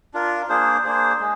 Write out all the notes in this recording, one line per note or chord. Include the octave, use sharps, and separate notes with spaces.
D4 F4 A#4
A#3 D4 G#4 C5
A#3 D4 G#4 C5
G#3